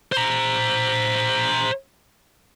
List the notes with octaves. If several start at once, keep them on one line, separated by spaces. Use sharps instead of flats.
C5 A#5